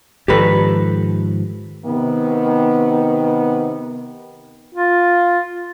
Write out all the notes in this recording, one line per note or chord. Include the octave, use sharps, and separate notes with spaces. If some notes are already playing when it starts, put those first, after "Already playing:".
G#2 D#3 F3 G4 A4 B4
C3 D#3 B3
F4